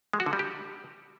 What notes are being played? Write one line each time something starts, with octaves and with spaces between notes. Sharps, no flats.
G#3
F#4
D3
G3
G4